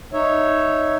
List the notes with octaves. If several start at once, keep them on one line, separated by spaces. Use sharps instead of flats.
D#4 C#5 E5